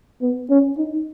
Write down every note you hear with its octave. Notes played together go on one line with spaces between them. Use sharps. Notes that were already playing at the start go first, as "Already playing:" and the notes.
B3
C#4
D#4